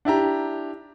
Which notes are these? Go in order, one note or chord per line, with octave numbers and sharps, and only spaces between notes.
D4 E4 G4 A#5